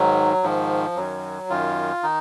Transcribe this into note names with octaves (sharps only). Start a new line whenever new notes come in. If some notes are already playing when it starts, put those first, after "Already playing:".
Already playing: G#2 D#3 F#3
G#2 D#3 F3
F#2 D#3 F#3
F#2 D#3 F4
D#3 D#4